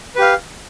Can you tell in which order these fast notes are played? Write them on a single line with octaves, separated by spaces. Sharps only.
B4 G4 F5